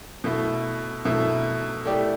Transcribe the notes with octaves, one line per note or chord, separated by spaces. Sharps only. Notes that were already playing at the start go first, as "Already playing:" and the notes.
B2 A3 E4
B2 A3 E4
A3 E4 G4 D5